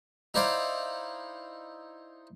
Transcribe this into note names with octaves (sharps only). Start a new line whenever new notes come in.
D#4 E4 C5 D5 F5